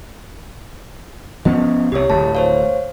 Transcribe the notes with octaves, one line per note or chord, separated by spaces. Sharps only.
F3 B3 C#4 D#5
C2 C3 G4 C#5
D1 A3 A5
C5 C#5 F5